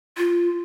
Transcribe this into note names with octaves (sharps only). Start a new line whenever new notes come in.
F4